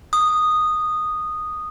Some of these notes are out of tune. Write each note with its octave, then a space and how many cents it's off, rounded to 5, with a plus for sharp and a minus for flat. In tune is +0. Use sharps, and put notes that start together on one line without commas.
D#6 -10